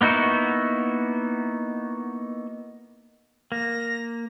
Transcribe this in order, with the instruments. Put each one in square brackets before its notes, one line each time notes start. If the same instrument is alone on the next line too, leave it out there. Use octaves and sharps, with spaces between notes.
[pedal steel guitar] A#3 B3 D#4 E4 F#4
[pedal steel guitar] A#3 [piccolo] A#6